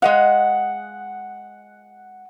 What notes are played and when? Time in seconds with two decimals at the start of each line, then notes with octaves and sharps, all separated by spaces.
0.02 G#3 D#5 F5 F#5